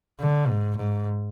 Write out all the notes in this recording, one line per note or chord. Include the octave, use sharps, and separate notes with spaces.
D3
G#2
G#2